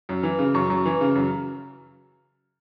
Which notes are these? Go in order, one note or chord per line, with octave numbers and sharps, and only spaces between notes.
F#2
E3
C#3
F#2 C#6
F#2
E3
C#3
F#2